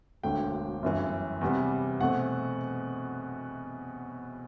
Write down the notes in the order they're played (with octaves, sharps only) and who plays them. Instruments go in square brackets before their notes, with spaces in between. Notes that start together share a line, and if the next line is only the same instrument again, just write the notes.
[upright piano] E1 D2 D3 A3 G5
G1 F#2 E3
E2 C3 G3 B3
E2 B2 A3 C4 F#5